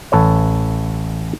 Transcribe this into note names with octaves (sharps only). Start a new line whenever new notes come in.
A1 A4 B4 C#5